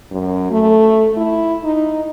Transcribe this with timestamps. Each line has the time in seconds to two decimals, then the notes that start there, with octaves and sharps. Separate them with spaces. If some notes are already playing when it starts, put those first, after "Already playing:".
0.11 F#2
0.51 A3
1.17 E4
1.64 D#4